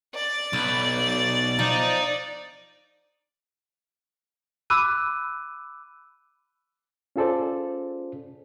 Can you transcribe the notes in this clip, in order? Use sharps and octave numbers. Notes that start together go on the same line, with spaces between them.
D5
B1 B4
F3 D4 D#4
B5 D6 E6 F#6 D#7
C#4 F4 G#4 A4 C5 D5